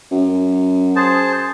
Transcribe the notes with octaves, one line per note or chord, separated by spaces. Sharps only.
F#2
G#4 C5 A5